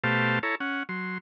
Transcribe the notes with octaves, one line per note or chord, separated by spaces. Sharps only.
B2 A3 G4 C5 F5 A5
E4 A4 C#5 A#5
C#4 F#5
F#3 C6